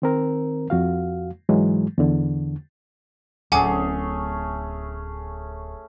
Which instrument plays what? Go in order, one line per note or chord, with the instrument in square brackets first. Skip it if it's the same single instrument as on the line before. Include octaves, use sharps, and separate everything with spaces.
[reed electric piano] D#3 C4 A#4
F2 F#4 F5
G#2 E3 F#3 G#3
E2 D3
[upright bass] D1 [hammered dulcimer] A3 C#4 G#4 [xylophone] F#5 G#5 D6